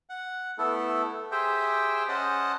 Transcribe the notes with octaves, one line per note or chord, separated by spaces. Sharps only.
F#5
A3 B3 E4 A4
G4 G#4 C5 E5 G5
C#4 C5 D#5 F#5 A5